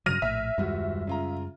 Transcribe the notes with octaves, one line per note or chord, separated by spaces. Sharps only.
G2 C#3 F#3 F6 A#6 D#7
A#1 A2 E5
D#1 F#2 G3 G#3 F#4
C#3 F4 A#5